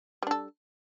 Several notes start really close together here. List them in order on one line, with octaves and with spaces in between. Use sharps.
G3 D4 A4